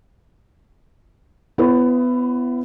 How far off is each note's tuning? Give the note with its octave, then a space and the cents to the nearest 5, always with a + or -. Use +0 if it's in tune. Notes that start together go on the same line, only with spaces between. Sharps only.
B3 +15 E4 +40 C#5 -35